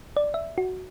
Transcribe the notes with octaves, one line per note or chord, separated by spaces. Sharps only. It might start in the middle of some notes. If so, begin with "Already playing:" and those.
D5
E5
F#4